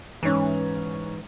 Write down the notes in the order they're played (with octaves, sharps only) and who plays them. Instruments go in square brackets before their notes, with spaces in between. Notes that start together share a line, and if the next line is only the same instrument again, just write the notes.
[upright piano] G#2 C#4 [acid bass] E3